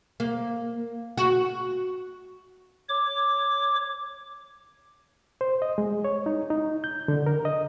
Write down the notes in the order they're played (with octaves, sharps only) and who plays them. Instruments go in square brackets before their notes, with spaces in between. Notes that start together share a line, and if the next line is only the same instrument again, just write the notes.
[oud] A#3
F#4
[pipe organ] C#5 D6
[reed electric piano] C5
D#5
G#3
C#5
D#4
D#4
G6
D3
A#4
D#5